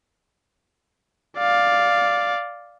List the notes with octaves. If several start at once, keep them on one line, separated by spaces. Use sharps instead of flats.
D5 F5